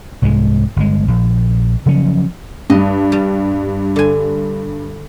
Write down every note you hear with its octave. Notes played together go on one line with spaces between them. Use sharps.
C2 G#2 F#3 G#3
G1 G#3
A#1
C#3 F3 F#3 C#4
G2 D#5
G3
D3 G#5